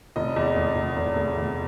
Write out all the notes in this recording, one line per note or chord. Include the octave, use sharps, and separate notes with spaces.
F1 D#5
E2
F1
F1
F1
F1
F1